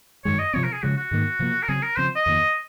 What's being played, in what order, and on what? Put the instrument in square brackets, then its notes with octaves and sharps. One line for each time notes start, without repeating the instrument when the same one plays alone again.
[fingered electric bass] F#2 D#3 G#3 [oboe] C#5
[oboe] D#5
[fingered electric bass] C3 F3 C4 [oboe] C#5
[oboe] A#4
G#4
[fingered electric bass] C#3 F3 G#3 [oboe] F#4
[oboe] F#4
[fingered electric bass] G#2 D#3 A#3
C3 F3 A#3
[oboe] A#4
[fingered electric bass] C#3 F#3 C4 [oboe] G#4
[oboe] A#4
[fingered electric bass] C#3 F3 C4 [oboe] C5
[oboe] D#5
[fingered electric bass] F2 D#3 A#3